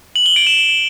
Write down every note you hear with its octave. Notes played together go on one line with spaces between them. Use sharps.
F#7
G7
D7
E7